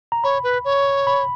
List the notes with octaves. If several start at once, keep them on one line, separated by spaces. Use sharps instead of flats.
A#5
C#5 B5
B4
C#5
B5